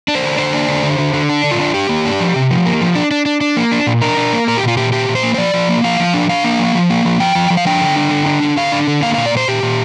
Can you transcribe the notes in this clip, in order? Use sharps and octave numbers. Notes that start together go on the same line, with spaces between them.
D4
C5
D3
D3 C5
D4
D3
D3
D3
D3
D4
D3
F4
D4
D4 G4
A#3
D4
F3
C3
F3
A#3
F3
D4
D4
D4
D4
A#3
D4
A#2
D4 A#4
D4
A#3
A#2 A#4
G4
A#2 F4
A#2 G4
A#2 G4
A#2
C5
A#3
C5
F3 D5
F3
A#3
F3 F5
F3
D4
D4 F5
A#3
F3
F3
A#3
F3
F3 G5
F3
F3
F5
D4 G5
D3
D4
D3
D4
D3
D3 F5
D4
D3
A#3 F5
A#2 F5
D5
A#2 C5
A#2 G4
A#2